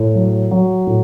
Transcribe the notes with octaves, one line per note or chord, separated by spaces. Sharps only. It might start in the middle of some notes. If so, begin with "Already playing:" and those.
Already playing: A2
F#3
F#3
A2